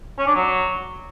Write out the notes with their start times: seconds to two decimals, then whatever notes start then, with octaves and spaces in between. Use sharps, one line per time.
0.18 C#4
0.27 D4
0.35 F#3